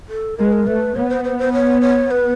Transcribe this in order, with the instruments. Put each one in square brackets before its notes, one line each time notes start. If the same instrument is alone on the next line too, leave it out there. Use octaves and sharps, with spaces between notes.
[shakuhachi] A4
[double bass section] G#3 [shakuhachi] A#4
[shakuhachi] B4
A#4
[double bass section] A3 [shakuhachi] B4
[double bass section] B3 [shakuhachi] C#5
[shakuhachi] C5
C5
C5
C#5
C#5
B4